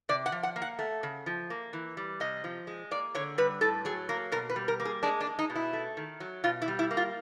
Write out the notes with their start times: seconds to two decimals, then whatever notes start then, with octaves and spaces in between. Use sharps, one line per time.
0.09 C3 D5
0.26 F#5
0.32 F3
0.43 F#5
0.56 A#3
0.62 F#5
0.79 A3
1.03 C#3
1.26 F3
1.50 A#3
1.73 E3
1.97 G3
2.20 C3 D#5
2.44 F3
2.67 G#3
2.91 A#3 D5
3.15 D3 C#5
3.38 G3 B4
3.61 A2 A4
3.85 F#3 G#4
4.09 A#3 A#4
4.32 B2 A#4
4.49 B4
4.56 G3
4.68 A#4
4.80 A#3
4.85 G#4
5.03 G#3 D4
5.21 D4
5.27 G#3
5.39 D#4
5.50 B2
5.56 E4
5.73 A3
5.97 D#3
6.20 F#3
6.44 B2 F4
6.62 E4
6.68 G3
6.79 E4
6.91 A#3
6.97 F4